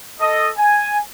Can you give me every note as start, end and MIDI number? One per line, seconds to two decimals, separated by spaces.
0.21 0.50 69
0.21 0.50 75
0.57 0.99 80